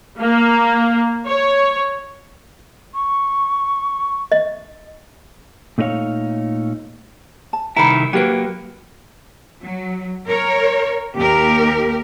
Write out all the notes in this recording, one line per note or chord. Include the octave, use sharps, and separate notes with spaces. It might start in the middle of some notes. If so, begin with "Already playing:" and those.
A#3
C#5
C#6
D#5
A#2 A3 D#4 G#4 C#5 F5
A5
C2 D#3 E4 A#5 B5
F#3 A#3 G4 B4
F#3
A#4 C#5
D#2 G4 A#4